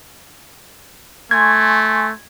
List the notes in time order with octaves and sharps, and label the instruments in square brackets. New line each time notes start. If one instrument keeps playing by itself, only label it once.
[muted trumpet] A3 [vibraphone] G#5 C6 C#6 [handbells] G#6